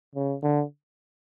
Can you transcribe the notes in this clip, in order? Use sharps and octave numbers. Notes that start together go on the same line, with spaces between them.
C#3
D3